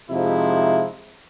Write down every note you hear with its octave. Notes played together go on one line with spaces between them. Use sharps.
F2 C3 F3 G#3 D#4 E4